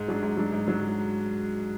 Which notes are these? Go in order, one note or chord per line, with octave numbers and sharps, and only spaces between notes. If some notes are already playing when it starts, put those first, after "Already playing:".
Already playing: G#2
F#3 D4
G#2
F#3 D4
G#2
F#3 D4